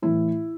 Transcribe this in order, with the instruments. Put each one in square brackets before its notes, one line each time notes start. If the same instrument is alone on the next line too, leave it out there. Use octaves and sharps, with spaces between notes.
[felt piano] A2 E3 E4